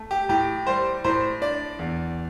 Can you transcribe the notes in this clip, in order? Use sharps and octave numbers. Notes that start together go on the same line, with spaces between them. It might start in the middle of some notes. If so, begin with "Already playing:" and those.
Already playing: A3
G4
A2 G4
G3 C5
A2 C5
D4 D5
E2